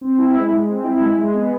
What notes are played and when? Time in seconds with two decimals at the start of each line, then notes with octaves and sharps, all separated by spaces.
0.01 C4
0.18 E4
0.35 G#3
0.52 G#3
0.68 C4
0.84 E4
1.00 G#3
1.18 G#3
1.34 B3